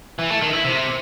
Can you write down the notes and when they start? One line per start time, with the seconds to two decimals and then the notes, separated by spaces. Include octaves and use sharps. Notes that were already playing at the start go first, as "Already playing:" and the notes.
0.19 E3
0.30 A3
0.42 D#3
0.53 E4
0.65 C3